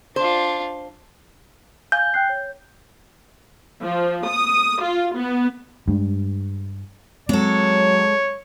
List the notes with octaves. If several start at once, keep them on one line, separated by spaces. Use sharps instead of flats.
D4 F4 C5
F5 G#5 G6
G5 F#6 C7
C#5
F3
D#6
F4
B3
G2 G#3
F#3 G#3 C4 A4 C#5